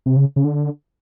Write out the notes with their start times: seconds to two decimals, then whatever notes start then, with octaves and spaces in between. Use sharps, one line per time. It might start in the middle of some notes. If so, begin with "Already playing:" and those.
0.06 C3
0.16 C#3
0.36 C#3
0.44 D3